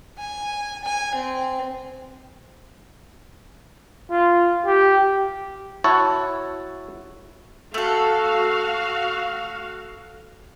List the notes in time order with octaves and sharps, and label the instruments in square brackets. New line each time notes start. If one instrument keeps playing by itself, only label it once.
[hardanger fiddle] G#5
G#5
C4
[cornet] F4
G4
[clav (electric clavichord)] E4 F#4 C#5 A5
[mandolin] A3 A4 [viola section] F#4 F5